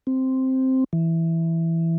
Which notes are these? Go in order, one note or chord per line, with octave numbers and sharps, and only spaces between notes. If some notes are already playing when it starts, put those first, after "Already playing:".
C4
E3